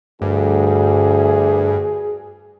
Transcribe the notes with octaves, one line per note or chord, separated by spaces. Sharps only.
D2 G2 G#4